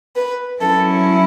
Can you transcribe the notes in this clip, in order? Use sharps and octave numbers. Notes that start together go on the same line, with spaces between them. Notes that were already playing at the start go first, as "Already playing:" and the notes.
B4
F#3 C#4 E4 A4